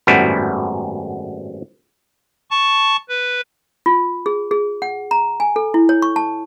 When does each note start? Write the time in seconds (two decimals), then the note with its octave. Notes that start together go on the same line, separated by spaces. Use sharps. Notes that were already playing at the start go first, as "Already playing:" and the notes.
0.07 G#1 F#2 A2 G3 B3 E4
2.51 A5 C#6
3.09 B4
3.86 F4
4.26 G#4
4.51 G#4
4.82 F#5
5.11 A#5
5.40 G#5
5.56 A4
5.74 E4
5.89 C#5
6.02 C#6
6.16 A5